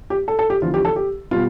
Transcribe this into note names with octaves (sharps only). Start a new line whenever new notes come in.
G4
A4
A4
G4
E2 D3 F3 F4
G4
A4
G4
B2 G3 F4